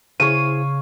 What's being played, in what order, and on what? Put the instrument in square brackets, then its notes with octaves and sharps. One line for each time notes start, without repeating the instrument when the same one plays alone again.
[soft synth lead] C#3 [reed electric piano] E4 G#4 C5 [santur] C#5 F5 [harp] D#7